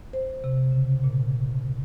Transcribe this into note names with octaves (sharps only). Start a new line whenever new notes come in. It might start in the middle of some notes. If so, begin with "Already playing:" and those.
C5
C3
C#3
A#2